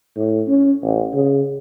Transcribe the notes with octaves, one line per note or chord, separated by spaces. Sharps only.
A2
C#4
A1
C#3